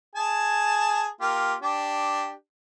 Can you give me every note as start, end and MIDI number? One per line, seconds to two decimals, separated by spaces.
0.15 1.09 68
0.15 1.09 80
0.15 1.09 81
1.21 1.55 58
1.21 1.55 65
1.21 1.55 67
1.62 2.32 62
1.62 2.32 67